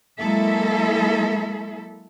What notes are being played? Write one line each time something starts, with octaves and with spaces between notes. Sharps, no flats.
F#3 G#3 A#3 E4 A4 E5